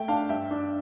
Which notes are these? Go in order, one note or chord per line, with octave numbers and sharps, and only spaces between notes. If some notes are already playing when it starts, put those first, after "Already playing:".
Already playing: A3 E5 G5
D4 F5 A5
G2 E5 G5
D4